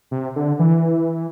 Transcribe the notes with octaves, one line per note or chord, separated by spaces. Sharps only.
C3
D3
E3